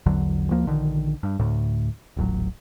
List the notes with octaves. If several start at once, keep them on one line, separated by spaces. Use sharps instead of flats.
A#1 E2 D3 F#3
D2 F3 A#3
A#1 D3 D#3
G2
D2 A2
D#1 A1 F#3